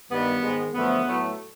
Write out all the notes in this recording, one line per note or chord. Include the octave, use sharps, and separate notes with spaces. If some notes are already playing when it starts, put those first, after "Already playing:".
G2 D#3 G3 B3
G#2 D#3 G#3
F#2 D3 F3 A3 B3
A2 F#3 A3